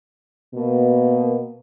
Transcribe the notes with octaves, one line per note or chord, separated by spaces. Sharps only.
B2 A#3